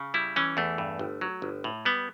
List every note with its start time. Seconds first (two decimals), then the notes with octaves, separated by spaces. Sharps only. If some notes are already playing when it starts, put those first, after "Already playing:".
Already playing: C#3
0.14 G3 E4
0.36 E3 C#4
0.57 E2 A3
0.78 G2
0.99 G1
1.21 F#3
1.42 G1
1.64 A2
1.85 G3 B3